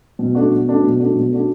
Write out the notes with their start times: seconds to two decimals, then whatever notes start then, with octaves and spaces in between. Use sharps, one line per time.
0.19 B2
0.35 A3 D4 F#4
0.51 B2
0.67 A3 D4 F#4
0.83 B2
1.00 A3 D4 F#4
1.15 B2
1.31 A3 D4 F#4